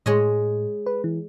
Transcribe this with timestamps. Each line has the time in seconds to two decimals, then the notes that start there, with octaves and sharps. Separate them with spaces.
0.06 A2 G#3 C#5 D#5
0.86 B4
1.04 E3